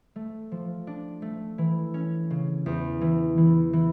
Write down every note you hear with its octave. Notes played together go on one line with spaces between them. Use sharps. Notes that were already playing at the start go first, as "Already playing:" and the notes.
A3
F3
D4
A3
E3
C#4
C#3
E2
E3
E3
E3